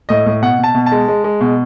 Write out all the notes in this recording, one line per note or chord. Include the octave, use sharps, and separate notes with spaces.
A2 D#5
A2
B2 F#5
B2
A5
B2
A5
G#3
G#3
G#3
B2